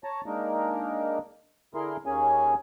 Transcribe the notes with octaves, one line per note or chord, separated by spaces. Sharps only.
C#5 A5 A#5
G#3 A#3 D4 D#4 A#4
D3 E4 G#4 A#4 C6
D#2 A#3 C#4 G#4 G#5